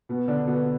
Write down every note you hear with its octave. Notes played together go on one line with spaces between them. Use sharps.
B2 B3
D3 D4
B2 B3